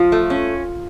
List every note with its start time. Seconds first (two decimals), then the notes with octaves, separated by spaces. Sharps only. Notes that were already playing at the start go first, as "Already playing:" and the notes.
Already playing: F3 F4
0.12 A3
0.30 C#4